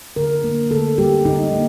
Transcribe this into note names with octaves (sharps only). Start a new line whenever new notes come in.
D3 A#4
A#3
D3 A4
G3 G4
D3 D#4
A#3